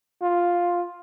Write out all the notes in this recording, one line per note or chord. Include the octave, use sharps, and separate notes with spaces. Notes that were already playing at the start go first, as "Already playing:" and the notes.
F4